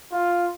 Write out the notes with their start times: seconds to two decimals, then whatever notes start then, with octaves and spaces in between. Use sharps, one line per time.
0.12 F4